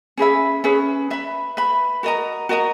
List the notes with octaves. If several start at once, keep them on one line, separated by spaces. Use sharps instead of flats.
C#4 G#4 B4 E5
C#4 G#4 B4 E5
B4 E5 B5
B4 E5 B5
F#4 A#4 D#5 A#5
F#4 A#4 D#5 A#5